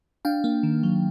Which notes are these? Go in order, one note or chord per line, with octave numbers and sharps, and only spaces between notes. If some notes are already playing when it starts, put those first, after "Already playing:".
D4 F5 G5
A#3
D#3
F#3